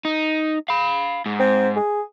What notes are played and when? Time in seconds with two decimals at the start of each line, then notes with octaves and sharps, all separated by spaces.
0.05 D#4
0.68 F5 B5
1.26 G#2
1.40 C4
1.76 G#4